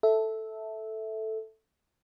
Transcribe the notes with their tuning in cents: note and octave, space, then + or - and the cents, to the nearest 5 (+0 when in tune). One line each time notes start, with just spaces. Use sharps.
A4 +0 E5 -10